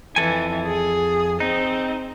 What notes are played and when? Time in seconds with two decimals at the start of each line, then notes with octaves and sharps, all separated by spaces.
0.16 F2 E3 A4 G#5
0.67 G#4
1.40 C4 D#4